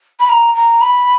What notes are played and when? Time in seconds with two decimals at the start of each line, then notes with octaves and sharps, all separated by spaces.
0.20 B5
0.29 A#5
0.54 A#5
0.81 B5